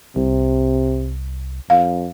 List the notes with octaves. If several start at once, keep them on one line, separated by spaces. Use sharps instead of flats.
C2 C3
F2 F5